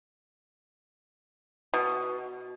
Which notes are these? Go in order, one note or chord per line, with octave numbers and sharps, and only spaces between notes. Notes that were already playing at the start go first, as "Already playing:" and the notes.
B2